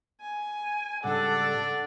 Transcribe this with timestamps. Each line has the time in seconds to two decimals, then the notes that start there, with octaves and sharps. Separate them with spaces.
0.21 G#5
1.04 G#2 C#3 G3 D4 A4 D5 F#5